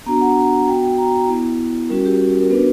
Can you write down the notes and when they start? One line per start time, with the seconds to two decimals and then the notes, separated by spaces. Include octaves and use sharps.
0.06 B3 D4 F#4 A#5
0.21 F#5
0.68 B3 F#4 G5
0.83 G5
0.98 A#5
1.28 B3 E4
1.89 G3 C#4 F#4 A#4
2.05 G4
2.20 F#4
2.30 G4
2.41 A#4
2.50 B3 D4 F#4 B4